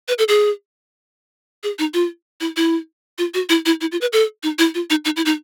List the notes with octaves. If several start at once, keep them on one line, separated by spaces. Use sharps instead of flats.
B4
A4
G#4
G#4
D#4
F4
E4
E4
F4
F#4
E4
E4
E4
F4
B4
A4
D#4
E4
F4
D#4
D#4
E4
D#4